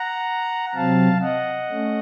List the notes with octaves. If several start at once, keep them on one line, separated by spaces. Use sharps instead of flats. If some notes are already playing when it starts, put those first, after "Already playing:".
Already playing: F#5 A#5
C3 F#3 C4 F5 A5
D#5 F#5
A3 C#4